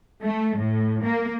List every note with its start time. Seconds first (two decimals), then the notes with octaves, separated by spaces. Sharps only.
0.23 A3
0.58 A2
1.04 A#3